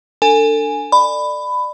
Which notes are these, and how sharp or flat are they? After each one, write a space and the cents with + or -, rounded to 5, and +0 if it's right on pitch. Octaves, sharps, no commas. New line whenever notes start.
D4 +0 A4 +30 G#5 +0
D5 +25 B5 +15